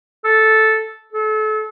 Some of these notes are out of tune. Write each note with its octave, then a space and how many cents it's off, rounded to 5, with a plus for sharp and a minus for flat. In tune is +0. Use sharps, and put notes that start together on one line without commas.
A4 -5
A4 -35